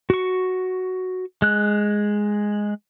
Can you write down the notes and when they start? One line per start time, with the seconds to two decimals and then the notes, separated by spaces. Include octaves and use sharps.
0.10 F#4 C#6
1.42 G#3 F#6